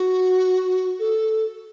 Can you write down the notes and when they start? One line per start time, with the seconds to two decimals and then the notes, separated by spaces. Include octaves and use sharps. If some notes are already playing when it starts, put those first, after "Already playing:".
Already playing: F#4
0.99 A4